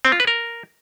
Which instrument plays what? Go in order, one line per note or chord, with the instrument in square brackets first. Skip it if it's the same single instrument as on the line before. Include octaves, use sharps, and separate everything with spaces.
[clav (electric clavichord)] C4
F4
B4
A#4